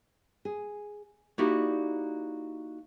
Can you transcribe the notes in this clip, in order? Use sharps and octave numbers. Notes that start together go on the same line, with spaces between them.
G#4
A#3 D#4 E4 F#4 G4 D5